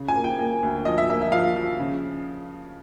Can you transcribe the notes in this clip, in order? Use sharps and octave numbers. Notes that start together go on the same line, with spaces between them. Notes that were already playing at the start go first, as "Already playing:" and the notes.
Already playing: C#3
G#5
A#3
G5
A#3
D2
F3 D#5
E5
A#3 E5
E5
F3 F5
F3
C#3